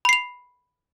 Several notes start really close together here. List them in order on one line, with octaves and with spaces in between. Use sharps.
B5 C7 F7